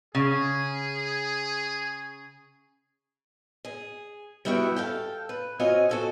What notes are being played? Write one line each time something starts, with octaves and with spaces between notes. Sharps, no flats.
C#3 G#4
G#4
G3 B3 E4 F#4 B4 G5
A4 F5 G5
B4
C4 F4 F#4 C#5 D#5 G#5
F#4 A4 G#5